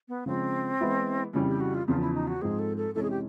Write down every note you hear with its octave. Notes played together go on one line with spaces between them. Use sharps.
B3
C#3 F3 G#3 C4
E3 G#3 B3 E4
F2 C#3 E3 G3 C#4
G4
F#4
F4
E2 C#3 F3 F4
E4
D#4
F#4
G#2 F3 G#3 C4 G#4
A4
A4
F2 C3 E3 G#3 C#4 A4
G#4
G4